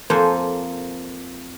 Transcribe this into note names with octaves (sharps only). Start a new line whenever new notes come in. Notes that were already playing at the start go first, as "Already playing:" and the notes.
F2 A#3 A4 C5 G#5